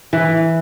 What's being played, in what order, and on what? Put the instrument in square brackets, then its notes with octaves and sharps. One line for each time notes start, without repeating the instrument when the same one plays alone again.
[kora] E3